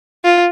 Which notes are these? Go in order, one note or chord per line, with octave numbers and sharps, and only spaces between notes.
F4